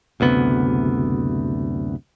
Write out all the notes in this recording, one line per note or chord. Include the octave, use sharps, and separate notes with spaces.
F#1 D2 C3 B3